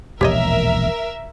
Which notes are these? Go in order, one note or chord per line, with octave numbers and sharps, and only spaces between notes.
E1 A#1 D#2 G4 A#4 C#5 D#5 E5